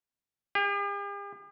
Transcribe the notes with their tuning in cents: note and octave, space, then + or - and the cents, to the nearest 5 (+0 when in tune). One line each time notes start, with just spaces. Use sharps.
G4 +45